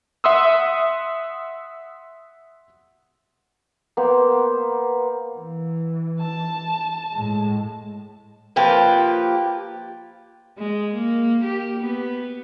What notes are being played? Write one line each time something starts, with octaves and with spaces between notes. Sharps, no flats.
E5 F#5 C6 D#6 E6
A#3 B3 C5
E3
A5
A2 G#3
F3 A#3 G4 B4
G#3
A#3
G4
B3